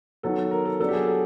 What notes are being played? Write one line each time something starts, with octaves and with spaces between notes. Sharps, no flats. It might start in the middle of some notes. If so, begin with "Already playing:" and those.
D#3 F#3 B3 A4
A#4
A4
F#3 B3 D4 A4
G4
G#4
A4